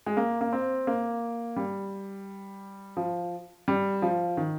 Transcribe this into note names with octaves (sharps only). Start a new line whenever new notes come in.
G#3
A#3
A#3
C4
A#3
G3
F3
G3
F3
D#3